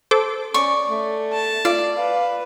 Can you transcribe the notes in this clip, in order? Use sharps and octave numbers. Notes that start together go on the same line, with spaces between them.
A4 C5 D6
C#4 D5 C#6
A3
A5
F4 D5
B4 F5